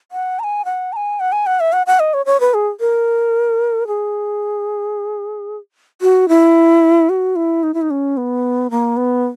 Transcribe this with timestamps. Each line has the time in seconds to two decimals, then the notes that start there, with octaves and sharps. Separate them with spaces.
0.12 F#5
0.39 A#5
0.44 G#5
0.65 F#5
0.93 A#5
0.96 G#5
1.20 F#5
1.32 G#5
1.46 F#5
1.60 E5
1.73 F#5
1.87 F#5
2.00 D#5
2.14 C#5
2.26 C#5
2.40 B4
2.54 G#4
2.80 A#4
3.87 G#4
6.01 F#4
6.29 E4
7.09 F#4
7.36 E4
7.63 D#4
7.74 E4
7.82 D#4
7.90 C#4
8.17 B3
8.70 A#3
8.97 B3